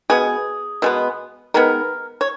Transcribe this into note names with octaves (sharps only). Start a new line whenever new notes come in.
B2 G#3 B3 G#4
B2 G#3 B3
D#3 G#3 B3 A#4
C#5